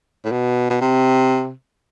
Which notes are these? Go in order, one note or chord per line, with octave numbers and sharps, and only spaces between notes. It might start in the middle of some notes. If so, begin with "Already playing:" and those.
A2
B2
B2
C3